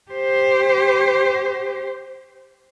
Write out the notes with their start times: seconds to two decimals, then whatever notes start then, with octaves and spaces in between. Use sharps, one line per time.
0.11 G4 C5